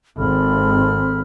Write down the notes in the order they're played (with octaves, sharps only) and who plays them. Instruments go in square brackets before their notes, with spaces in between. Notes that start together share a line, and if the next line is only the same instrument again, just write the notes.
[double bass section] G#1 [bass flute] C4 [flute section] A4 B5 F6